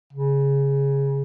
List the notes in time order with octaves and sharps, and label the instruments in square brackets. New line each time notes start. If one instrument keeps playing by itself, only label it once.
[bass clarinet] C#3